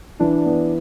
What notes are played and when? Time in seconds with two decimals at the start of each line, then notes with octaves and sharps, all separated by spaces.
0.19 E3 D4
0.46 B3